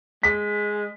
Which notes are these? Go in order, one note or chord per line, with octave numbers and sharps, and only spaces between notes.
G#3 B6